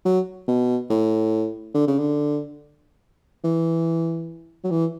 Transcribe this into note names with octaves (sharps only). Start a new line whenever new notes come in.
F#3
B2
A2
D3
C#3
D3
E3
F#3
E3